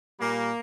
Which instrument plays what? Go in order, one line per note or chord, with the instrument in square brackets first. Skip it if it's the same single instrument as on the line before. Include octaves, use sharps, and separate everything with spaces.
[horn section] A#2 G3 A#3